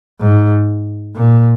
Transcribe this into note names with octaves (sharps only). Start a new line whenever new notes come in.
G#2
A#2